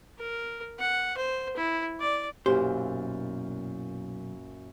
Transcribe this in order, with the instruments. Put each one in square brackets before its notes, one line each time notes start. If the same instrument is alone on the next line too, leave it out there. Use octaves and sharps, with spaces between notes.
[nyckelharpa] A#4
F#5
C5
E4
D5
[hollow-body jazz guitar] B1 C5 [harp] F#2 A#2 E4 [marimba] G4